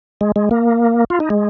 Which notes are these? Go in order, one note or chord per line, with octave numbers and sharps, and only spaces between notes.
G#3
G#3
A#3
F4
D#4
G#3